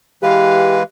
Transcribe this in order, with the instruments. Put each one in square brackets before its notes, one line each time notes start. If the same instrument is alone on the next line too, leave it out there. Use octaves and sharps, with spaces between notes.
[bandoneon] E3 G#3 B4 [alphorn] G4 [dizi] F5